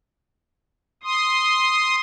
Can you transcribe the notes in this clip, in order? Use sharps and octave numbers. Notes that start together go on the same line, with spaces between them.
C6 D#6